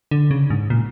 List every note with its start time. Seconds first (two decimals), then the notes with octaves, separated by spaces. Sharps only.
0.11 D3
0.31 C#3
0.50 G#2
0.70 A#2